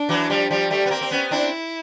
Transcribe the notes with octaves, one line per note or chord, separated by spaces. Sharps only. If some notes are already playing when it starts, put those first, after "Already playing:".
Already playing: D4
E3 F#3
F3 G3
F3 G3
G3 A3
B3
A#3 C4
C4
B3 C#4
C4 D4 E4